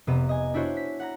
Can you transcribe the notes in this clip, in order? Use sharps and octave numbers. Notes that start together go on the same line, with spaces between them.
F1 C3 B3 E5 A#5 D#7
D#5 G#5
D4 E4 F#4 C5 C#5
B6
F#5 A#5 A#6